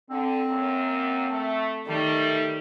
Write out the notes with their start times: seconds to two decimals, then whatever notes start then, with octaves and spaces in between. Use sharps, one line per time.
0.10 D3 C4
0.47 F#2 A#3
1.28 A3
1.87 D#3 G3 A3